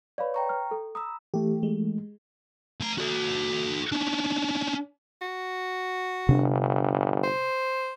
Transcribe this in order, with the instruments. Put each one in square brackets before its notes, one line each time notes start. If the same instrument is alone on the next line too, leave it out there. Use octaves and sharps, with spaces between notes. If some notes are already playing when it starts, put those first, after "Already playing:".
[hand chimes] B4 C#5 [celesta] D5 F5 B5
[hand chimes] G5 A#5 C#6
[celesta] F6
A4
[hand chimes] A#5 B5 E6 [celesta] D#6
[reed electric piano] E3 A3 [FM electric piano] G4
[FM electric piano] G#3
[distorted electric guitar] A3 A#5
F#4 A4
C#4 D4
[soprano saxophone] F#4
[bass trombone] G1 [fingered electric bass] C3 D4
[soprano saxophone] C5